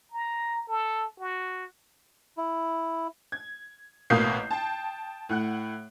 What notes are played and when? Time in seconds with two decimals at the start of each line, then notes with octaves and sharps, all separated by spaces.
0.11 A#5
0.68 A4
1.19 F#4
2.37 E4
3.32 G#6
4.10 A1 B2 A#3 D#6 G6 C7
4.51 G5 A5
5.29 A2 F#5 F#6